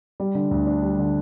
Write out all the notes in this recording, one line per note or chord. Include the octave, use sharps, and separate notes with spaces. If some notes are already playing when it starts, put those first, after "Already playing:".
G3
D3
D2
D4
G3
D3